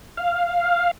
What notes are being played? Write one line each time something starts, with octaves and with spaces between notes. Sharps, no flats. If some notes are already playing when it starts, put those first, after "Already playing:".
F5